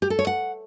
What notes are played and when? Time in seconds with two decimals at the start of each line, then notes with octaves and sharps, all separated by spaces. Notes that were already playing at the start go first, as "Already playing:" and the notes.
0.02 G4
0.10 A4
0.19 C#5
0.27 F#5